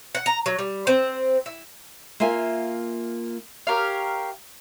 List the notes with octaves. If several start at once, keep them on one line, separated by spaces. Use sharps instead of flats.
F#5
A#5
F#3
G3
C4
E4
A#3 F4 E5 G#5
G4 A#4 C#5 F5